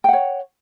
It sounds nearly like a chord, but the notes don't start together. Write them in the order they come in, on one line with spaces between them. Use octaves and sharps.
G5 F#5 C#5